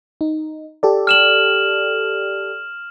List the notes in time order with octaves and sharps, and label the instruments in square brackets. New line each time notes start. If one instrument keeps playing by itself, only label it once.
[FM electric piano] D#4
G4 A4 D5
[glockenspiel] F6 E7 F#7